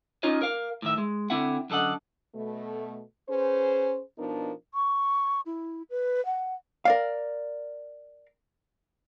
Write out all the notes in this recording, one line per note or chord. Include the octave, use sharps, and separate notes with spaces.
C#4 D#4 F4 C#5 D#5
A#4 F5
A2 D#3 E5
G#3
D3 C4 E4 E5 F#5
F#2 D3 A4 D#5 F#5
B2 A3
C#4 G#4 B4 C5
B2 F3 B3 D4 D#4 A#4
C#6
E4
B4
F#5
A#4 D5 F5